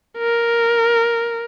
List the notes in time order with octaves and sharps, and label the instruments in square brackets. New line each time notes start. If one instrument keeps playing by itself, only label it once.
[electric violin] A#4